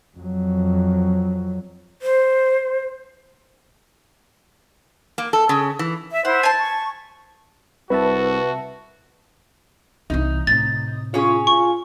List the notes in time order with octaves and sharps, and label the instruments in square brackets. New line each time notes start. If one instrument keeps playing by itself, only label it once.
[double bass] F2 F#3
[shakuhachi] C5
[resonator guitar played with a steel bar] A#3
A4
C#3
E3
[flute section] E5
[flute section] E4 C5 [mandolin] F#5
[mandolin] G#5 A5
[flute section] C#6
[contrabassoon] C2 [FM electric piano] C3 E5 A5 [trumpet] F#4 [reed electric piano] B4
[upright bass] C2 E3 [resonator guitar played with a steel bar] D#4
[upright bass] A2 C3 [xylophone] A6
[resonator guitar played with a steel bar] C#4 G#4 C#5 [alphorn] F4
[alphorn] F4 [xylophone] C#6